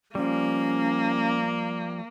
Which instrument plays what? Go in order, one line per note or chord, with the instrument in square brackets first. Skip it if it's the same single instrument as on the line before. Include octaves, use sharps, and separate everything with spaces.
[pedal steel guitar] F3 G3 [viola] A#3 [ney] C#4